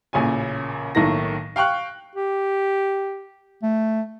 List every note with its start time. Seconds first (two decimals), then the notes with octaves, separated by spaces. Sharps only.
0.13 A1 A#2 C#3 C#4 G#5
0.95 B1 A2 D#3 A#3 A#6
1.56 F5 G5 C#6 F#6
2.15 G4
3.63 A3